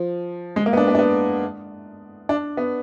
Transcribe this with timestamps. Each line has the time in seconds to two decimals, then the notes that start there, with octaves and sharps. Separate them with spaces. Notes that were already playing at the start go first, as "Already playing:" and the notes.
Already playing: F3
0.56 G#3
0.66 A#3
0.73 B3
0.77 D4
0.88 B3
0.95 D4
0.99 B3
2.29 D4
2.57 B3